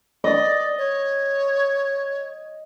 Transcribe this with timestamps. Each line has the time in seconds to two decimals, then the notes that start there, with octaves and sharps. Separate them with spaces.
0.24 D5 D#5
0.78 C#5